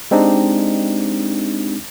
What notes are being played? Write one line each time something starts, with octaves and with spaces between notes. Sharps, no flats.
G#3 C4 D4 D#4 G4